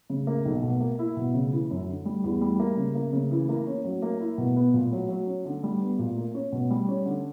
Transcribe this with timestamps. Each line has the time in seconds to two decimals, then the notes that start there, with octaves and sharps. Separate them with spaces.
0.10 C#3
0.27 A#3
0.45 B1
0.63 B2
0.80 A#3
0.99 E4
1.17 B2
1.34 C#3
1.52 E3
1.71 F#2
1.88 D3
2.05 G3
2.24 E2
2.41 G3
2.60 A#3
2.77 C#3
2.95 A#3
3.13 C#3
3.31 E3
3.49 A#3
3.67 C#4
3.84 F#3
4.02 A#3
4.20 E4
4.38 B2
4.56 B3
4.74 A#2
4.92 F#3
5.09 F#3
5.27 C#4
5.45 D3
5.63 G3
5.81 B3
5.99 A#2
6.17 A#3
6.35 C#4
6.52 B2
6.70 G3
6.88 C#4
7.06 D3